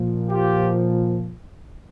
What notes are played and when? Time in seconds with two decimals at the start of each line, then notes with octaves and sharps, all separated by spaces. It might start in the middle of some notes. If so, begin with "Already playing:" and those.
Already playing: A#2 F3
0.30 F4 G4